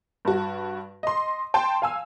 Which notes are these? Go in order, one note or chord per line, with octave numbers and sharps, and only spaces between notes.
G2 F#4
D#5 C6
G5 A5 C6
F5 G#5 E6